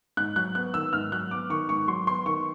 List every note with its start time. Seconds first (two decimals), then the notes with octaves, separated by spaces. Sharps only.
0.17 G#2 F#6
0.36 F#3 F#6
0.55 B3 F#6
0.74 D#3 E6
0.93 G#2 F6
1.12 F#3 F#6
1.31 B3 D6
1.50 D#3 C#6
1.69 G#2 C#6
1.88 F#3 C6
2.07 B3 C6
2.26 D#3 C#6